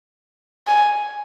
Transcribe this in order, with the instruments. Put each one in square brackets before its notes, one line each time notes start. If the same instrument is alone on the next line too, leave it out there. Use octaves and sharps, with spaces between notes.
[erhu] G#5